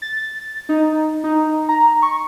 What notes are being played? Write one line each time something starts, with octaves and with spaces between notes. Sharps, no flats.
A6
D#4
D#4
A#5
C#6